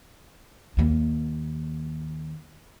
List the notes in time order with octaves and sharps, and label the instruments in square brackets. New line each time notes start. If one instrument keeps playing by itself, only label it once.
[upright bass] D#2 A#3